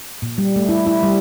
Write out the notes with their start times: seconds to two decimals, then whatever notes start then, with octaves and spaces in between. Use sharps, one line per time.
0.22 A#2
0.38 G3
0.56 A3
0.69 E4
0.87 E4
1.03 G3